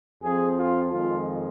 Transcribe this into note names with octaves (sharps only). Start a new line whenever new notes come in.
F2 F3 C4 G#4
F4
F2 D#3 G#3 F4